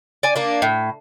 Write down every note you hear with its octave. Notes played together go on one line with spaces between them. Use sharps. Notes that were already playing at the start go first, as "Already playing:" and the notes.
D5 G#5
A#3 D4
A2